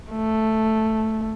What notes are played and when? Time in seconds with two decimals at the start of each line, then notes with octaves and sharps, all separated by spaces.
0.11 A3